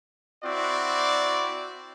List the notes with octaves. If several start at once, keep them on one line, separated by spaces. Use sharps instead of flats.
C4 E4 F#4 D5